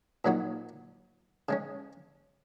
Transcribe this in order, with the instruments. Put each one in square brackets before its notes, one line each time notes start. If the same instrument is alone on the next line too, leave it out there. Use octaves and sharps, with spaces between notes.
[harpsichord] A#2 F#3 A#3 D#4 F#4
C#3 G#3 C#4